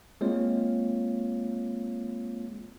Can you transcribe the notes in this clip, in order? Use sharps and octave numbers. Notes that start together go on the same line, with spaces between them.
G#3 A#3 C4 F4 C#5